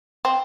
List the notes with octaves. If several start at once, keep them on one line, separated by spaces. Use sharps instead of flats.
C4